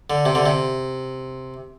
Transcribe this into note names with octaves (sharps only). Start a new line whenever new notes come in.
D3
C3
D3
C3